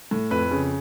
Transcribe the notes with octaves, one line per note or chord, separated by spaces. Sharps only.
A2
F2 B4
C#3